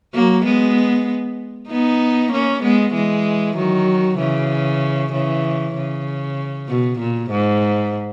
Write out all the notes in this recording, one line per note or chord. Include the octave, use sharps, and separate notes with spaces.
F#3 A#3
G#3 B3
B3 D#4
A#3 C#4
G#3 B3
E3 G#3
D#3 F#3
C#3 E3
C#3 E3
C#3
B2
A#2
G#2